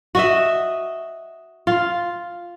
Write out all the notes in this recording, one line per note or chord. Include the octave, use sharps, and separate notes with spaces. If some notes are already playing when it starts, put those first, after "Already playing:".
F#4 D#5 E5
F4